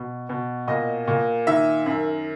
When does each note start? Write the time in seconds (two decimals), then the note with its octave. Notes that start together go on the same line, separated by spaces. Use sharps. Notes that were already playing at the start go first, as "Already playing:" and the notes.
Already playing: B2
0.29 B2
0.68 A#2 D#5
1.08 A#2
1.47 D#3 E5
1.86 F#2